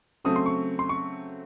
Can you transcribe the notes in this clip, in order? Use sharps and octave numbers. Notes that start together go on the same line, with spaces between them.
C#3 F#3 A3 C4 D#6
C6
C#6
C6
C#6